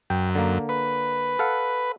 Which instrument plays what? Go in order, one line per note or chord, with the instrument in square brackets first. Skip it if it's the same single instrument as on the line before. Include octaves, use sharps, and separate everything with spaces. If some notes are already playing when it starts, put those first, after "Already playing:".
[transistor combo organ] F#2 [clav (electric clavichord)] G5
[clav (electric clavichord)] D3 A#3
[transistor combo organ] B4
[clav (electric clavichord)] A4 F5 F#5